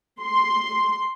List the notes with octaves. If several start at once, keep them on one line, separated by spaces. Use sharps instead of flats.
C6